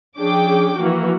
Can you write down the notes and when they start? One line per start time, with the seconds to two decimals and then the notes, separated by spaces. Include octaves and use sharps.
0.17 F3 C#4 D4 G#4 G5 D6
0.76 E3 F3 A#3 F#4